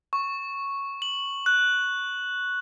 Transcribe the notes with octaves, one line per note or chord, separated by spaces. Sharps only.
C#6
F#7
F#6